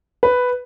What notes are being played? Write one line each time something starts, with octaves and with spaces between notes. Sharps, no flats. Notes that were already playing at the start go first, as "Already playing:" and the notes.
B4